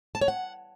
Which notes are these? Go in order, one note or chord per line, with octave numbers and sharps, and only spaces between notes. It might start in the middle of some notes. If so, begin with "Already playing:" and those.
A5
C#5
F#5